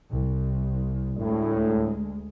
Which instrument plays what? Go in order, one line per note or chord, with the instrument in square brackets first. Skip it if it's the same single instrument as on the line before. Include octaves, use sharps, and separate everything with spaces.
[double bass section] C2
[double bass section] D2 G#3 [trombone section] A2